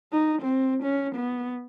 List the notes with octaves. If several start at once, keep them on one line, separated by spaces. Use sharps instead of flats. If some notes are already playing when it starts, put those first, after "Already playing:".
D#4
C4
C#4
B3